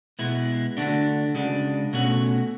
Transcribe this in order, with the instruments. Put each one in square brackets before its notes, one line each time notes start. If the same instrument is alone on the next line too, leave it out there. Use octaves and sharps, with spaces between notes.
[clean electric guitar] B2 G#3 B3 E4
D3 A3 D4 F#4
C#3 G#3 D4 F#4
B2 A3 C#4 F#4